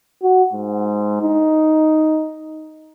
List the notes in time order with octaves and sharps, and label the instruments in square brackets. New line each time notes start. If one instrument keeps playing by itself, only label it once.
[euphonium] F#4
G#2
D#4